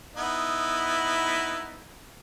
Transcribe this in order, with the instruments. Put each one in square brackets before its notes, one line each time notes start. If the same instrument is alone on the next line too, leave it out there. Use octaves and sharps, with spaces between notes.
[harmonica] B3 D#4 E4